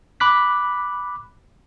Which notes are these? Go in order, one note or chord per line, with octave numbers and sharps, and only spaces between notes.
B5 D6 F#6 B6